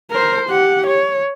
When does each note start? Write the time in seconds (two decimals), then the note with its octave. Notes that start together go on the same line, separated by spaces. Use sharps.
0.11 A#4 C5
0.49 G4 F#5
0.87 C#5